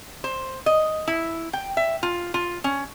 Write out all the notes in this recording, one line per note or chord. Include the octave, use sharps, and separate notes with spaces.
C5
D#5
E4
G5
E5
F4
F4
C#4